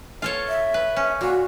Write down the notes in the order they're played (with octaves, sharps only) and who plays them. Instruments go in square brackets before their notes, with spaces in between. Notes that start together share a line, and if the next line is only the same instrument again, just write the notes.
[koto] F4 A4 C#5
[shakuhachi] E5
[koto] B4
C#4
[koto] A#2 [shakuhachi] F#4